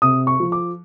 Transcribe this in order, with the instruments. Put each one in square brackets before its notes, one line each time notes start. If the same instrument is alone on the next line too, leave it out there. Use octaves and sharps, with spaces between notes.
[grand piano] C3 D#6
C#6
F3
D6